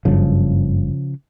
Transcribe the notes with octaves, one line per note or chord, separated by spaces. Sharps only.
F#1 G2 C#3 F3